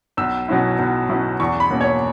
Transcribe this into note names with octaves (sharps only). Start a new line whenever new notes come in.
B1 E6
B2 F#3 C#4 E4
B1
B2 F#3 C#4 E4
E2 C#6
B5
B2 A#3 C#4
C#5